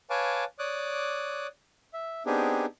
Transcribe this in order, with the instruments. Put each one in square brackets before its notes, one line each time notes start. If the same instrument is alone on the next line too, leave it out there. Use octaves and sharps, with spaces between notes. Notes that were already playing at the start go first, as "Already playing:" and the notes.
[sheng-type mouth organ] B4 C#5 F5 G#5 A5 D6
C#5 D5 D6 D#6 F#6
E5
B3 C4 D4 D#4 G4 G#4